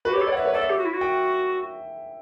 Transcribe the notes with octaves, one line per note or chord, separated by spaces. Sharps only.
F#4 B4
G4
C#5
A4
C#5 D5
F#5
B4 E5
C#5
A4 D5
E5
G4
F#4
E4
F#4
G5